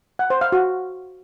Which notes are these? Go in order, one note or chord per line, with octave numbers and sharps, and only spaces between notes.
F#5
C5
F5
F#4